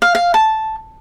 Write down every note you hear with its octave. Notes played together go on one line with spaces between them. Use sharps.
F5
F5
A5